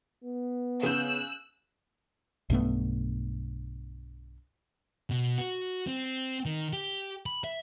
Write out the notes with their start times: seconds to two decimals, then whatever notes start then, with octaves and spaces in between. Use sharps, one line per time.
0.24 B3
0.83 C#3 E6 F#6 G6
2.50 B1 G2 A3 B3
5.11 B2
5.38 F#4
5.87 C4
6.45 D#3
6.73 G4
7.26 B5
7.44 E5